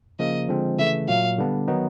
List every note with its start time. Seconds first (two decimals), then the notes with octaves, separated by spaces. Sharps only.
0.19 C#3 F3 A#3 D#5
0.48 D3 F3 G#3 C4
0.79 C#3 E3 A3 E5
1.09 A#2 F#3 A#3 F5
1.39 D3 G3 B3 D4
1.68 D#3 F#3 B3 D#4